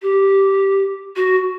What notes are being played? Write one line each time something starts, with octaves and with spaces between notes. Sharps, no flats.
G4
F#4